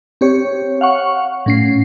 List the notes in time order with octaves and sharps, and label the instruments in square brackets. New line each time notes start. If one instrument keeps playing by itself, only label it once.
[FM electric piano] C4 G4 C#5
F5 F#5 C#6
A2 C#4 C7